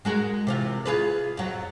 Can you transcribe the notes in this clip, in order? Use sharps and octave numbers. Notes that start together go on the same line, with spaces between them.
G#3 F#4 A#4
C3 E3 F4
F4 G#4 B4
F2 F#3